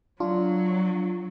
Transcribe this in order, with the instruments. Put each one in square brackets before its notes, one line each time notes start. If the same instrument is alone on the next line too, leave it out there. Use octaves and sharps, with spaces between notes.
[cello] F#3 [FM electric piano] D4 F4